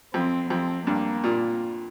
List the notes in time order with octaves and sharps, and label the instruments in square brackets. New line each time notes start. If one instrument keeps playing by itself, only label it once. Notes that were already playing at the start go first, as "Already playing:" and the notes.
[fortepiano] F2 [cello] C4
[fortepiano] F2 [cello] C4
[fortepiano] G2 [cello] A#3
[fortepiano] A#2